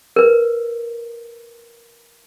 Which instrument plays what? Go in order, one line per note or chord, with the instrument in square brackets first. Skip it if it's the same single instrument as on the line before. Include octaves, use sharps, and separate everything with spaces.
[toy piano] A#4 B4